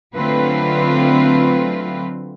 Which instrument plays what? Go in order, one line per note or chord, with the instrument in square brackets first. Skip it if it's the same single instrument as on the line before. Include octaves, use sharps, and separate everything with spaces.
[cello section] D3 F#3 A3 C4 F4 B4